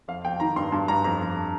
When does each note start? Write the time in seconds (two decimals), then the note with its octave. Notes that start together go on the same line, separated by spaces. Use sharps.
0.08 F2 F5
0.25 F2 G5
0.40 D#3 A#5
0.56 G2 C6
0.72 G2
0.88 G2 A#5
1.04 F2 A#5
1.20 F2